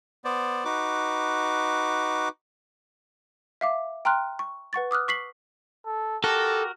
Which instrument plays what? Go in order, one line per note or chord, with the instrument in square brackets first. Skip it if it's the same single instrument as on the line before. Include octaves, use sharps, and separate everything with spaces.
[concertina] B3 C5 D5
D#4 F#4 B4 D6
[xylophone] E5 F5 D6
G5 A#5 C6 F6 F#6
C#6
B4 F#5 C#6 A6
D6 D#6 F6 F#6
C#6 B6 C7 F#7
[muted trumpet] A4
[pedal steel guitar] F#4 A#4 [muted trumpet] G4 [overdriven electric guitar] A4